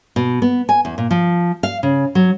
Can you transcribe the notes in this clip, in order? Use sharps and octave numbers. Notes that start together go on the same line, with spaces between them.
B2
B3
G#5
E2
A#2
F3
F5
C#3
F#3